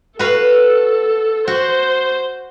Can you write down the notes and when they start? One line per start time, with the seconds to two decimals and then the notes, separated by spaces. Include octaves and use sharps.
0.19 F#4 A4 B4 F5
1.48 F#4 C5